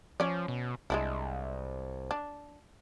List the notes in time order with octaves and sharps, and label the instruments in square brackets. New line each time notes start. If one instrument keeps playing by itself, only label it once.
[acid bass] F3 [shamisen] C#4 D5
[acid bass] B2
[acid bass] C2 [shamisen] G#3 D4 E4
[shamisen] D4